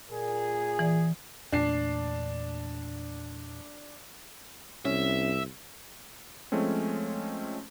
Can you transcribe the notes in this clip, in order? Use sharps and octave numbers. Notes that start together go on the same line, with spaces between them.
A#2 G#4
E3 D5
E2 A#2 A3 D4 C7
C2 C#4 E5
F3 G#3 A3 C4 C#4